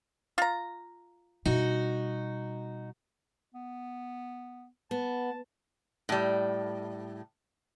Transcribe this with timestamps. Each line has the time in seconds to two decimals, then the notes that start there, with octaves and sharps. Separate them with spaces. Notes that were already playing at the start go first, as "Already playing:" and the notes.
0.38 F4 A#5
1.45 B2 G3 D#4 F#4
3.55 B3
4.91 B3 A5
6.09 A2 G3